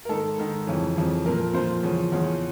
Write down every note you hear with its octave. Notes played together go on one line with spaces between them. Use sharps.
A#4
G#2 D#3 A4
G#2 D#3
F2 C#3 E3
F2 C#3 E3
A#2 F3 A#4
A#2 F3 C5
E2 C#3 F3
E2 C#3 F3